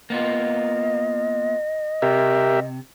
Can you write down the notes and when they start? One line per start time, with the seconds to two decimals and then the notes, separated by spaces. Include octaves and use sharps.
0.10 A#3 B3 F4 D#5
2.02 C3 G4 A#4 E5